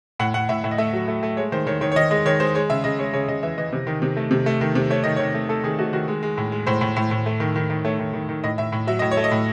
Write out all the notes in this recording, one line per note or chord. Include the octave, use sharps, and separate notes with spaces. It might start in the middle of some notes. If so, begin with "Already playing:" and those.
A2 F#5
A2 F#5
A2 E5
A2 E5
D#5
A3 E5
F#3
A3
A3
G#3 C#5
D#3 C5
D#3 C#5
D#3 C#5
C#5
D#3 D#5
G#3 D#5
D#3 C#5
G#3 C5
G#3 C#5
C#3 E5
C#3 D#5
G#3 C#5
C#3 C#5
C#3 D#5
E3 E5
E3 D#5
C3
D#3
C3
A3
C3
A3
D#3
C3
A3 C#5
D#3 D#5
D#3 C#5
A3
A3 A4
D#3 G#4
A3 F#4
D#3 F#4
G#3
G#3
A2
G#3
A2 C5
A2
A2
A2
A3
D#3
D#3
D#3
A3 C#5
D#3
D#3
D#3
A2 D#5
A2 E5
A2
F#3 E5
A2 D#5
C#5
A3
D#5
A2